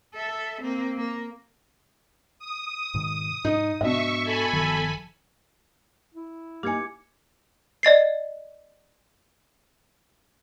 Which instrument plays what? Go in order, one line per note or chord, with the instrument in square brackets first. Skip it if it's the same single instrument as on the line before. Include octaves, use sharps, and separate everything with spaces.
[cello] A4 E5
A#3 C4
A#3
[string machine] D#6
[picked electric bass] G#2 B2 D#3
[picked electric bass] G#2 [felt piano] D#4
[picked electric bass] G#2 C4 D4 [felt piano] B2 D#5 [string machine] E5 C#6
[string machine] A4 G#5 B5
[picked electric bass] G1 D#3 F3
[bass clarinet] E4
[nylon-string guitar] A#3 D#4 [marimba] G4 G#5 [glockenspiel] D6 G#6 C#7
[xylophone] D5 D#5 A6 C7